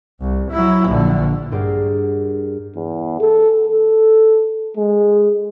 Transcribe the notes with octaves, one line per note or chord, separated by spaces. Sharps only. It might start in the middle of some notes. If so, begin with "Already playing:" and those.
C2
F#3 E4
A#1 D3
G2 G#4 A#4 C5 D5 F#5
E2
A4
A4
G#3